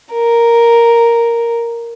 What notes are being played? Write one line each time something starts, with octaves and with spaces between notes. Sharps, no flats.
A#4